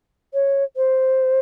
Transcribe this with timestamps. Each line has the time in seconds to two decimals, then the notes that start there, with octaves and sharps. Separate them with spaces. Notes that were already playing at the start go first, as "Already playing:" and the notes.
0.34 C#5
0.76 C5